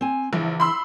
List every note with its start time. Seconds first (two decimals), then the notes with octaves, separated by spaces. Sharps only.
0.01 C4 G#5
0.33 A#1 C#3 E3
0.60 B5 C6 E6